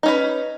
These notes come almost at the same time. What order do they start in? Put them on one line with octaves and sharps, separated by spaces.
D#4 C#4 B4